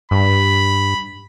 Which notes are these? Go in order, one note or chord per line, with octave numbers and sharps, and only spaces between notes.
G2 B5